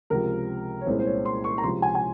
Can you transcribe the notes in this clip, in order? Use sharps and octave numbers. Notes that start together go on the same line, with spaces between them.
C#2 C3 F3 A#4
C#5
C2 A#2 G#3 C#4 E4 C5
C5
C#5
C6
C#6
A#5
C#2 C3 F3 C6
G#5
G#5